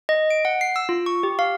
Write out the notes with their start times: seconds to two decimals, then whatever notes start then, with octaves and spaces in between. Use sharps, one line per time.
0.09 D#5
0.30 D7
0.45 F#5
0.61 C7
0.76 E6
0.89 F4
1.06 C#6
1.23 G4
1.39 F5